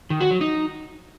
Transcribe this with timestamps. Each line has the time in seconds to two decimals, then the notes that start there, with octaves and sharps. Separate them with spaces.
0.10 D#3
0.21 F#4
0.31 F#3
0.41 D#4